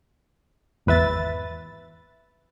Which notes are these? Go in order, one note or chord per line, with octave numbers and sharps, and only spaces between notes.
G#1 E2 B4 E5 A6